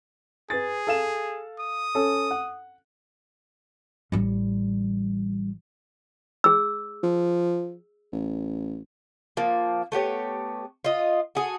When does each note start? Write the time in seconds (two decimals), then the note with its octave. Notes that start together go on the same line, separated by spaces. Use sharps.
0.50 G#4 B4 A6
0.87 A4 F5 E7
1.59 D#6
1.95 C#4 A4
2.31 F#5
4.12 A1 G3
6.44 G#4 E6
7.04 F3
8.13 A1
9.37 F3 A#3
9.92 A3 B3 G4 C#5
10.84 F4 D#5
11.35 F#4 G#4 A4